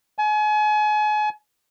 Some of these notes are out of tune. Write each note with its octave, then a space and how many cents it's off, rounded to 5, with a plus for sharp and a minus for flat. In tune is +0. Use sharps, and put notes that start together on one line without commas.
G#5 +35